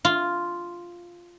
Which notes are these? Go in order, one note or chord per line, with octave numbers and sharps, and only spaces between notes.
F4